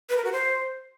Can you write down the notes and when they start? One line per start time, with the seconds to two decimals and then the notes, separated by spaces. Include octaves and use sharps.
0.09 B4
0.17 A#4
0.25 F#4
0.32 C5